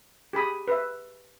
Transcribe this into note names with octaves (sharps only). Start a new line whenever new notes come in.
G4 G#4 B5 D#6
B4 E5